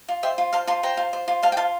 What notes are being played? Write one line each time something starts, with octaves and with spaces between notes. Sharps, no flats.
F4
C5 E5 G5
F4
C5 F5 A5
F4 A5 C6
C5 G5 A#5
F4
C5
F4
C5 F5 A5
G5
F4 F5 A5